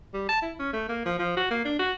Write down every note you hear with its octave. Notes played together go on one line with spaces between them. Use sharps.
G3
A5
E4
C#4
A3
A#3
F3
F3
F#4
A#3
D4
F#4